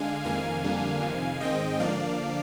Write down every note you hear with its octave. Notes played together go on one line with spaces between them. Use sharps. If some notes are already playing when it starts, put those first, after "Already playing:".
Already playing: D3 G#3 D4 F5 G#5
F2 C3 D#3 A#3 F5 G#5
F2 D3 G3 A#3 D4
F2 C3 D#3
G#2 D#3 G#3 C4 D#5 G5
D3 F3 A#3 D4 D5 F5